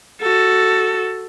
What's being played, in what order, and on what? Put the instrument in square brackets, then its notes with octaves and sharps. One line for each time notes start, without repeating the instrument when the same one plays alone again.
[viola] F#4 A4